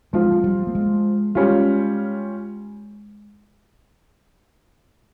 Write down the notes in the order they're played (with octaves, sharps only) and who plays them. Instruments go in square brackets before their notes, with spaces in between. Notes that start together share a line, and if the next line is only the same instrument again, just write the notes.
[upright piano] F3 C4 F4 [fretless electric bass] G#3
[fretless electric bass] G#3
G3
A#3
G#3
[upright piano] G3 C#4 F4 [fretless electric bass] G#3